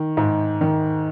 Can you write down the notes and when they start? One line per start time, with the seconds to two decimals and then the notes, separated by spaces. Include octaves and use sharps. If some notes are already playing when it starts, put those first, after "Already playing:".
Already playing: D#3
0.17 G#2
0.61 D#3